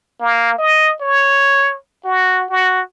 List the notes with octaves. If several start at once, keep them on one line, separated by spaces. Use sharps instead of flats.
A#3
D#5
C#5
F#4
F#4